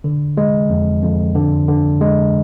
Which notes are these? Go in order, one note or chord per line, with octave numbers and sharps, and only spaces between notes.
D3
G#3
F2
F2
D3
D3
G#3